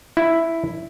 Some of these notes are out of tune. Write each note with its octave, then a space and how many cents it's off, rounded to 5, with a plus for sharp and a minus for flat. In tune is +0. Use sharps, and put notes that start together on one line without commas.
E4 +0